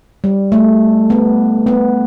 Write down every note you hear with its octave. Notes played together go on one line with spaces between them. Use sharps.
G3
A3
B3
B3